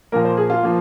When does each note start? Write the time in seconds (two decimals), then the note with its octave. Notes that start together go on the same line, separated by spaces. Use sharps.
0.12 A#2 F3 A#3 A#4
0.25 C5
0.37 G#4
0.50 F4
0.63 F3 A#3